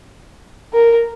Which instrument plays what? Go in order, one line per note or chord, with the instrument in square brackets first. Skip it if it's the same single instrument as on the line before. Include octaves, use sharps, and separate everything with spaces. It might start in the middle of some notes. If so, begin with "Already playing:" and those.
[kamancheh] A#4